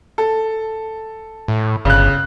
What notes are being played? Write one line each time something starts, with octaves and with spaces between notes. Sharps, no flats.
A4
A2
G1 C#3 F#6